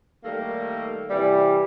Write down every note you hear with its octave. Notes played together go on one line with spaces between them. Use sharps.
D#3 G3 A3 A#3
C3 E3 G3